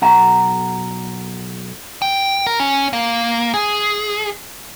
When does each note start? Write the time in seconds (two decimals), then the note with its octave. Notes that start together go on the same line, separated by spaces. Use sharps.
0.02 B1 F#5 A#5
2.02 G5
2.46 A#4
2.60 C#4
2.93 A#3
3.54 G#4